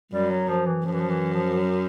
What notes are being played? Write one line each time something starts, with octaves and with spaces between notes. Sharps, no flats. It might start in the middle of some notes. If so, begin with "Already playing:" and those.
F#2 G3
F#3
F3
E3
F#2 F3
E3
F3
E3
F3
F#3